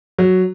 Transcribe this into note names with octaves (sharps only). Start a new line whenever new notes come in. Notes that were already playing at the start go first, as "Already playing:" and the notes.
F#3